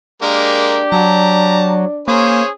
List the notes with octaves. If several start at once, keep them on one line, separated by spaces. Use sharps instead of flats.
G#3 A#3 D4 G4 A#4
F#3 A5 A#5
A#3 C#4 G#4 C5 C#5